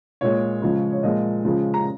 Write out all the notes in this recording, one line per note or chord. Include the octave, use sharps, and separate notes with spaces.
A#2 G#3 C#5
C#3 F3 G#3
C#5
A#2 F3 G#3 D#5
C#3 F3 G#3
A#5